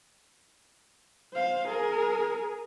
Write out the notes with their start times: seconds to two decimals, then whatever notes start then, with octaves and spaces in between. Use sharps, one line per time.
1.33 C5 F5
1.68 G#4 A#4